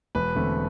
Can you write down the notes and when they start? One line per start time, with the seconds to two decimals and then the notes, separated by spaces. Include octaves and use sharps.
0.15 E1 B4
0.35 E2 D3 A3 C4